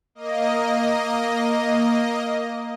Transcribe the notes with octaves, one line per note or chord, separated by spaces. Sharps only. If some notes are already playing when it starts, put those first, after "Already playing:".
A#3 D#5